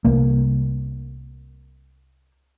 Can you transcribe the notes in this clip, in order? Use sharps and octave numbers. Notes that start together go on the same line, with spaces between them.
C2 A#3